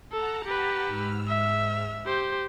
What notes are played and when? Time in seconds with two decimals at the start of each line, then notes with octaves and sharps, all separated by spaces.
0.12 A4 F#5 A5 A#5
0.45 G4 B4
0.86 G#2 E6 F6
1.27 E5
2.06 G4 C5